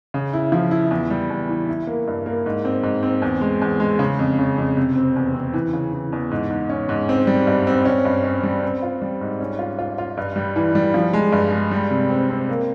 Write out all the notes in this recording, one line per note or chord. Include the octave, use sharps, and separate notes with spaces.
C#3
E4
F3
E4
E2
G3
E2
E3
E4
A#3
G2
A#3
G#2
C4
G#2
C4
E2
G#3
E2
G#3
C#3
F2
C#3
F2
C3
C4
E2
C4
E3
C#3
E3
E2
G#2
G#2
C#4
G#2
C4
G3
G2
C4
C#4
G2
C#4
G3
C4
F4
G3
G#2
C#4
F4
F4
F4
G2
G3
E3
G3
F3
G#3
G2
G#3
G3
C3
C4
C4
A#3